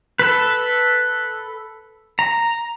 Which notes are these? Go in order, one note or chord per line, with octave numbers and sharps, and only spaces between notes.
A4 B4
A#5